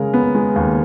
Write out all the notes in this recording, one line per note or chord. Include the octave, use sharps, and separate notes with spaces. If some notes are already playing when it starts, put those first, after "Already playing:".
Already playing: C#3 G#3 A#4
B3
G#3
D#2